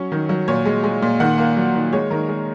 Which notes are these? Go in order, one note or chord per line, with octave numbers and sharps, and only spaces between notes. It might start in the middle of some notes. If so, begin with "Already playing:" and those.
Already playing: F#3 C#4 C#5
D#3
F#3
A#2 C#5
G#3
G#3
A#2
D#3 F#5
A#3
F#3
D#3
G#3 C#5
D#3 A#4
G#3